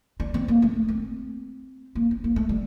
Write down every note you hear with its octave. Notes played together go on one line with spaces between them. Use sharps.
D4
C4
A#3
A3
C4
A#3
C4
A#3
A3
G3